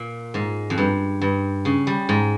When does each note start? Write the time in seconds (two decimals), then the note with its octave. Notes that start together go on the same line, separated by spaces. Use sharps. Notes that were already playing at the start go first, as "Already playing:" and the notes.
Already playing: A#2
0.34 G#2
0.70 F2
0.78 G2
1.21 G2
1.65 C#3
1.87 G3
2.09 G#2